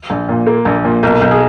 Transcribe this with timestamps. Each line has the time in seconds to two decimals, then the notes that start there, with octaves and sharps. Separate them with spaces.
0.10 A#1
0.29 A#2
0.46 A#3
0.65 A#1
0.84 A#2
1.03 B1 A#4
1.21 B1
1.31 G#4